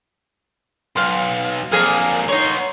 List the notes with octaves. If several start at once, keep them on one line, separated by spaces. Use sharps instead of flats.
B1 F5 C6
F2 A#2 A#3 G#4 A#4
B3 D#4 C#5 C6